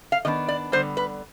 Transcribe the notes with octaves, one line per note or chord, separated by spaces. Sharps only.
F5
D#3 B3 D4 D#5
D5
D3 G3 B3 C5
B4